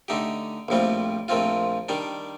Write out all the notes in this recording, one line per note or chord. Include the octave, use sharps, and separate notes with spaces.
D3 A3 D#4 G4
A#1 A2 G3 C4 F4
A#1 A#2 A3 C4 F4
D#3 G3 D4